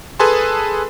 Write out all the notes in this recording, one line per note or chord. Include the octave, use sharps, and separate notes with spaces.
G#4 A4 B4 G#5 A5 C6